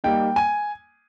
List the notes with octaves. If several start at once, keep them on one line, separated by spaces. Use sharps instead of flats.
G3 A#3 D#4 G5
G#5